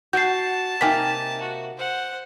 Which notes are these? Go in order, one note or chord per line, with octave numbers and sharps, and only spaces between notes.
F#4 A5 G6 C7
C3 A#3 D#4 G5 G#5 B6
F#4
C5 F#5